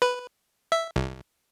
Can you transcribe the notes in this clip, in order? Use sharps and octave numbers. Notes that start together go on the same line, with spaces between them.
B4
E5
C2